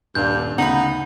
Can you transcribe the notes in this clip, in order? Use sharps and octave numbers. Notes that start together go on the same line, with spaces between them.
D#1 G2 D4 F5 G6
D2 C#3 D#4 F#5 B5